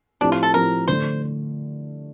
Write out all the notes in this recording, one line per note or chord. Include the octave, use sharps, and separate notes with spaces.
A2 F3 C4 D4 G4
F4
A4
A2 F3 C4 G4 A#4
D3 A3 C5